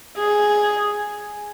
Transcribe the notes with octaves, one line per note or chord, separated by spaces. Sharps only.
G#4